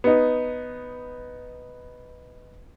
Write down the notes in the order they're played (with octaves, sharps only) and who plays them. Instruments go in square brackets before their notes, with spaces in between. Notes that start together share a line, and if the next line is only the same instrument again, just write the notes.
[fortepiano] B3 D#4